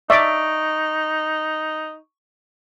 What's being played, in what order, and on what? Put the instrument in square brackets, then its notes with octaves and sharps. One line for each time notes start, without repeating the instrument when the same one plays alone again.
[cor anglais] D#4 [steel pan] D5 E5 [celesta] C#6 D7